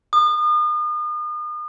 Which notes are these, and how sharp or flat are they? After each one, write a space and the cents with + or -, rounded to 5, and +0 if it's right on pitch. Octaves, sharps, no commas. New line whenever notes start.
D#6 -40